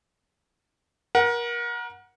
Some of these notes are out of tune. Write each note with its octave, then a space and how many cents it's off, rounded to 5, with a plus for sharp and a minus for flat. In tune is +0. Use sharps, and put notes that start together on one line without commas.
A#4 +30 F#5 -5